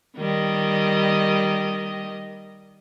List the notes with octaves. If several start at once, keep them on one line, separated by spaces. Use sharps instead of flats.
D#3 G3 D#5